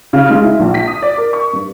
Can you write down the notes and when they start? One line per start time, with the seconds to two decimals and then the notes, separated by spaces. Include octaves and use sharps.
0.13 C#3
0.30 G#3
0.44 E4
0.60 A#1
0.74 B6
0.87 D#6
1.02 D5
1.18 A#4
1.33 C#6
1.53 G2